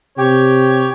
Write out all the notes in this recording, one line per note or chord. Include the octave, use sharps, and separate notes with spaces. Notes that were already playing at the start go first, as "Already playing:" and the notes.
C3 G4 C#5 G5